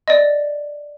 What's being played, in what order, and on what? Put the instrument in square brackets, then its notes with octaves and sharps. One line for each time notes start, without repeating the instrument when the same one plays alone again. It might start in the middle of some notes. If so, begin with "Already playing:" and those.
[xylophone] D5 D#5